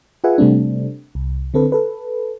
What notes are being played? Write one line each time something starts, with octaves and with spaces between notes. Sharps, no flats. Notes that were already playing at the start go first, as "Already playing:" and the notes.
F4 G#4 B4 E5 F#5 G#5
C3 G3 A3 C4 D4
C2
D3 C4 A4 B4
A4 B4